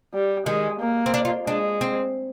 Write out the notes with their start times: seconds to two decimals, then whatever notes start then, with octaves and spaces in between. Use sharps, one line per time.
0.14 G3
0.46 D#3 G#3
0.80 A#3
1.06 C4
1.14 D4
1.25 F4
1.47 G#3 D4
1.81 C4